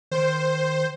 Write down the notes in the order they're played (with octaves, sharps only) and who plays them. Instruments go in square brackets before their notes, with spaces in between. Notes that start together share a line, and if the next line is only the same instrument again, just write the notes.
[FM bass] D#3 [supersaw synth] C5